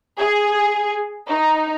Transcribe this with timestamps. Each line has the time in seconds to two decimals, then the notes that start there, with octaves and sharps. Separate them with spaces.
0.18 G#4
1.28 D#4